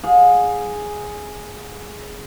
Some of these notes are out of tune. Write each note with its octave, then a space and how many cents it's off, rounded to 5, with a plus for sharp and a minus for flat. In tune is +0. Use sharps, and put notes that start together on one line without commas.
G#4 +0 F5 +45